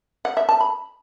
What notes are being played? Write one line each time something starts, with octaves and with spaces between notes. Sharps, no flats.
F#5
E5
A5
B5